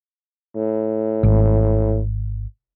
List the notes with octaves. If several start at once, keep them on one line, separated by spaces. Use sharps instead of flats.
A2
G#1